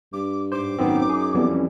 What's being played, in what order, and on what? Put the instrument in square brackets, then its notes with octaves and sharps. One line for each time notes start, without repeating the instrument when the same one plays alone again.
[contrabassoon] G2 [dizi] D6
[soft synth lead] G#2 [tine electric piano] C5 [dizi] D6
[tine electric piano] G#1 B3 C4 [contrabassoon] F#2 [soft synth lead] D#4
[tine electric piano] G#4
[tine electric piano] F2 E3 G3 [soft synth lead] B3
[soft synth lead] C#4